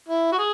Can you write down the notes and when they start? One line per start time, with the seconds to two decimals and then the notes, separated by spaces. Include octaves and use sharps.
0.09 E4
0.32 F#4
0.38 G#4